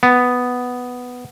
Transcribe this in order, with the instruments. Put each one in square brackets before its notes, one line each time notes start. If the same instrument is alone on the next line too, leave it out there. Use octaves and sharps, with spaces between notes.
[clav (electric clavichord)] B3